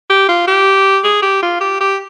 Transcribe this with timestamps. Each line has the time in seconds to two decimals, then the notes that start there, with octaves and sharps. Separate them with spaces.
0.10 G4
0.29 F4
0.47 G4
1.04 G#4
1.23 G4
1.42 F4
1.61 G4
1.80 G4